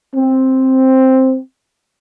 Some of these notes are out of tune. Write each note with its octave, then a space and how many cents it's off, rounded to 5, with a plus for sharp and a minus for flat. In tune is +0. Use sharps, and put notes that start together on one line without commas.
C4 +5